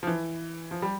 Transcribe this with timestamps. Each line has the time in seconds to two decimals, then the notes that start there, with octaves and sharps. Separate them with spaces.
0.03 F3
0.07 E3
0.71 F3
0.82 G3